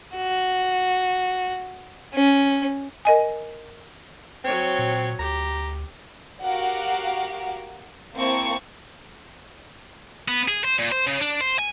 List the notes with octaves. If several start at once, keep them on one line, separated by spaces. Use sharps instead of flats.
F#4
C#4
A#4 D#5 G#5
F#3 C4 C#5
A#2
D2 G4 A#5
F#4 G4 A#4 F5 F#5
A#3 C4 E4 A5 C#6
B3
G#4
C5
A#2
C5
C#3
D4
C5
G#5